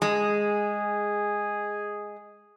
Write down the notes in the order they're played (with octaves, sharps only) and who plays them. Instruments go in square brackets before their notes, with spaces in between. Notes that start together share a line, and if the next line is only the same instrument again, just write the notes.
[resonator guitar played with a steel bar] G#3 [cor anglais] G#4